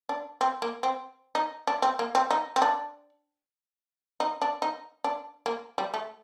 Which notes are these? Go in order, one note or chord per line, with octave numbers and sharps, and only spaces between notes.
D4
C4
A#3
C4
D#4
D4
C4
A#3
C4
D#4
C4
D4
D#4
D4
D#4
D4
A#3
G3
A3